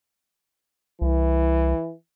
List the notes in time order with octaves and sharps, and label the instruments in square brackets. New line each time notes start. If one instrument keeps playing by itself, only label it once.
[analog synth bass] C2 [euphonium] E3